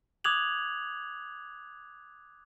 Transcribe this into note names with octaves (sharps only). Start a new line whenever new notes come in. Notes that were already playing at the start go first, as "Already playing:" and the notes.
D6 D#6 F#6 G#6 F7 F#7